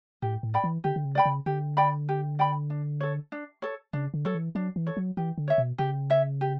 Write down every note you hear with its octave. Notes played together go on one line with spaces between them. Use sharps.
A2 G4
A2
D5 G5 B5
E3
D3 G4
D3
C#3
D5 G5 B5
C#3
D3 G4
D5 G5 B5
G4
D5 G5 B5
D4
A4 C#5
D4
A4 C#5
C#3 D4
D3
F#3 A4 C#5
E3
F#3 D4
E3
A4 C#5
F#3
E3 G4
D3
C#5 E5
B2
C#3 G4
C#5 E5
G4